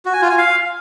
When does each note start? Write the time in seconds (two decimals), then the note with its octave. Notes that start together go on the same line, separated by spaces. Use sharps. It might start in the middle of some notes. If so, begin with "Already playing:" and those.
0.05 F#4
0.13 G#5
0.22 F4
0.30 G#5
0.38 F5